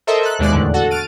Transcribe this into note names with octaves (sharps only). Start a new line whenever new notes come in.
A4 A#4 C5 D#5 E5
A4 F#6
D#2 B2 G#3 D5 F#6
E2 A2 D3
F#4 A4 F#5
F6 A6 D7 D#7